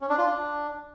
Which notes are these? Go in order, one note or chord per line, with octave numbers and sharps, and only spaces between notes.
C#4
D4
F4
D4